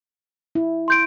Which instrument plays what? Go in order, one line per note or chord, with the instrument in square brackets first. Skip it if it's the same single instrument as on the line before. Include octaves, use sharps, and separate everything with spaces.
[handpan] E4
[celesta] C6 G6 D7